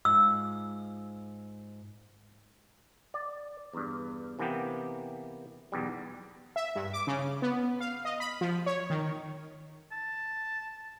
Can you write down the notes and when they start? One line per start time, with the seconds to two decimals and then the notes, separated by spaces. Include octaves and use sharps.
0.05 G#2 F4 E6
3.14 D5
3.73 E2 G2
4.39 C3 E3 A#3 B3 G4
5.72 B1 E2 G3
6.56 E5
6.75 G2
6.93 D6
7.07 C#3
7.42 B3
7.80 F5
8.05 D#5
8.20 B5
8.41 F3
8.66 C#5
8.90 D#3
9.92 A5